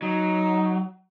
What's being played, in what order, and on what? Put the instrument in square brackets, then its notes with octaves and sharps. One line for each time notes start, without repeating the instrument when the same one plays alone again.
[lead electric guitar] F#3 [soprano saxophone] D#4